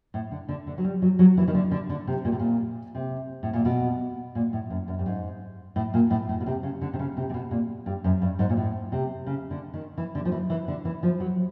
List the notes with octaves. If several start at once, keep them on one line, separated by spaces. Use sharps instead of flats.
A2
D3
D3
D3
F#3
G3
F#3
F#3
E3
D#3
D3
D3
D3
C3
A#2
A2
A#2
C3
A2
A#2
B2
A#2
A2
F#2
F#2
G2
G#2
A2
A#2
A2
A2
B2
C3
C#3
D3
C3
C#3
C3
C3
B2
A#2
G2
F#2
G2
G#2
A#2
A2
C3
C#3
D3
D#3
E3
D3
F3
E3
E3
D3
E3
F3
F#3